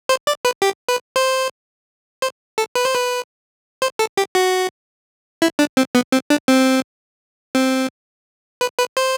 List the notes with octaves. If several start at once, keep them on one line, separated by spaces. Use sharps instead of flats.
C5
D5
B4
G4
B4
C5
C5
A4
B4
C5
B4
C5
A4
G4
F#4
E4
D4
C4
B3
C4
D4
C4
C4
B4
B4
C5